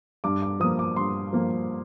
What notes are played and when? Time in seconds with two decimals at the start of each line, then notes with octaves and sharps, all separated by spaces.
0.24 G2 D6
0.42 D6
0.60 F3 A#3 D#6
0.79 D6
0.96 G2 C6
1.33 F3 A#3